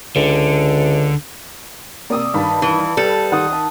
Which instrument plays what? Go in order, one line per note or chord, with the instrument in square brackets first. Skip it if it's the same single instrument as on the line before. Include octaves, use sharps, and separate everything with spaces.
[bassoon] C#2 [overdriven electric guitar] D3
[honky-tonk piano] C3 A#3 [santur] D5 D#6 E6
[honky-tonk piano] G2 D#3 B5 [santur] F5 A5
[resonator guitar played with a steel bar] E3
[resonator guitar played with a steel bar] G3 A4 [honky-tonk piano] B4
[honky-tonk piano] D#3 [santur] F#5 C6 D#6
[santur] E5 A5